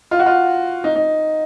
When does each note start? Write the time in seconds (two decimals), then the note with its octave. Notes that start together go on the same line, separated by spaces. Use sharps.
0.11 F4
0.19 F#4
0.26 F4
0.84 D#4
0.95 D#4